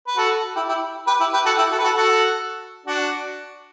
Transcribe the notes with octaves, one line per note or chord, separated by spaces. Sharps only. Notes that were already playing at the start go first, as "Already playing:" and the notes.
B4
F#4 A4
E4 G4
E4 G4
G4 B4
E4 G4
G4 B4
F#4 A4
E4 G4
F#4 A4
B4
F#4 A4
F#4 A4
D4 F#4